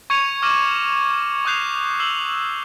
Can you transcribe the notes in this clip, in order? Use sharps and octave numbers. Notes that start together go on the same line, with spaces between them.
C#6 G#6 C#7 D#7 F7
D6 F6 A#6 D#7 E7 F#7
C#6 D#6 F#6 G6 C7 F7
E6 C7 E7 F#7 G7